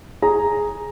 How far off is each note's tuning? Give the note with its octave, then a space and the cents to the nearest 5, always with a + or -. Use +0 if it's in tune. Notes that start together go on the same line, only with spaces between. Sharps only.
G#4 +0 A#5 +0